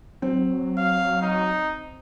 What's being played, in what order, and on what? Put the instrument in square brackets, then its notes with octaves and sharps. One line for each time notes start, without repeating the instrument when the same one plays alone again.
[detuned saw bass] F#3 [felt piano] C4
[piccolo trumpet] F5
D#4